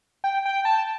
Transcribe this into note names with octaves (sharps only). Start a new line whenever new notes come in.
G5
G5
A5